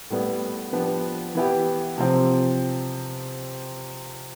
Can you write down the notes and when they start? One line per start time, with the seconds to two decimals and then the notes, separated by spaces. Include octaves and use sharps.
0.10 A2 G3 B3
0.73 F3 B3 D4 G4
1.35 E3 B3 E4 G4
1.98 C3 F3 C4